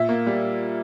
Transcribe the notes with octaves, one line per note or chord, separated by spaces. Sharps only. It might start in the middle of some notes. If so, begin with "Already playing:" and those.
Already playing: A#2 E5
A#3
G3